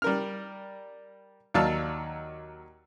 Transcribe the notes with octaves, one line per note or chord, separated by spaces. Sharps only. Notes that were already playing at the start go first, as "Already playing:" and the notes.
G3 A#4 F6
D#2 F#3 D5 F5 A5 E6